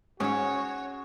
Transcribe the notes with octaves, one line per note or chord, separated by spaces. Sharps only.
G#2 C#4 F#4 C#5 E5